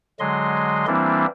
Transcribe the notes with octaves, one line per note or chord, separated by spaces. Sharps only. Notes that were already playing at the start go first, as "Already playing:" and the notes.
D3 F#3 G#3 D#5 C6
E3 G3 A#3 C4 D4 E4